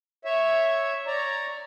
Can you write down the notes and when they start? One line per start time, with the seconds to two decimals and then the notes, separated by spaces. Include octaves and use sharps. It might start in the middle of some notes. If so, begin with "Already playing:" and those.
0.25 C#5 E5
1.07 C#5 D5 A#5